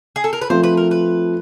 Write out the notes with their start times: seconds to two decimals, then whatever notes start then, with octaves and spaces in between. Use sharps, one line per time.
0.16 G#4
0.24 A4
0.33 A#4
0.41 B4
0.50 F3 A3 C4 C5
0.63 B4
0.77 A#4
0.91 B4